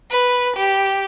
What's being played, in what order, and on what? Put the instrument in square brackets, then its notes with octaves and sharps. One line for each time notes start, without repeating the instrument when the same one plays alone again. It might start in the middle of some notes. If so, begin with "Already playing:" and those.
[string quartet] B4
G4